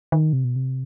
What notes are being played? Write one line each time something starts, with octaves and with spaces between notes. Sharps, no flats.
D#3
C3
B2
C3